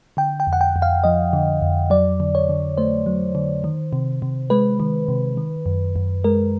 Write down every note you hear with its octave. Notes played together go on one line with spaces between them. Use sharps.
D3 G5
G5
F2
F#5
G5
F2
F5
F3 D#5
D3
F2
F#3 D5
D3
C#5
D3
A3 C5
F#3
D3
D#3
C3
C3
G#3 B4
D#3
C3
D#3
F#2
F#2
G#3 A#4